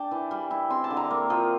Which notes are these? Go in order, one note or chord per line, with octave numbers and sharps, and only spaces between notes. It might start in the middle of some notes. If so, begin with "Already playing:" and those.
Already playing: D4 G5 A5
E3
G3
E4
C4 C6
A5
D3
A#5
A#3
F3